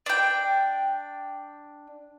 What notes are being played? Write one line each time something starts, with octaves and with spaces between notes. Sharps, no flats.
D4 G5